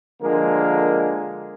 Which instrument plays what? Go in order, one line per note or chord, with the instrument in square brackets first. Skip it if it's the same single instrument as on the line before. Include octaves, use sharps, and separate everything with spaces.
[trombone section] D3 F3 G#3 A#3 A#4